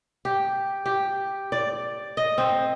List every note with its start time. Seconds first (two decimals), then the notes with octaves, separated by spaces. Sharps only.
0.25 G4
0.86 G4
1.52 D5
2.17 D#5
2.38 C4